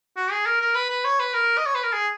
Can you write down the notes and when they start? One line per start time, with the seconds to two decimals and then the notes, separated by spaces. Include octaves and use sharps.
0.17 F#4
0.32 G#4
0.46 A#4
0.61 A#4
0.75 B4
0.90 B4
1.05 C#5
1.20 B4
1.34 A#4
1.58 D#5
1.66 C#5
1.75 B4
1.83 A#4
1.93 G#4